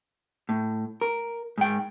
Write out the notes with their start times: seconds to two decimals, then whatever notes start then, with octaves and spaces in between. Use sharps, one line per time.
0.49 A2
1.01 A#4
1.58 G#2 G5